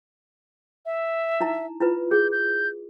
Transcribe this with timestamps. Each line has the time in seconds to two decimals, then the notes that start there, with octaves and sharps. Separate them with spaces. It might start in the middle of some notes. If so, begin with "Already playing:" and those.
0.86 E5
1.41 D#4 E4 A#5
1.81 E4 F4 B4
2.11 G#4 G6
2.32 G6